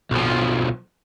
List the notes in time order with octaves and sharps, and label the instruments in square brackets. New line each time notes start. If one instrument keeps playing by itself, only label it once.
[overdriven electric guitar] B1 F3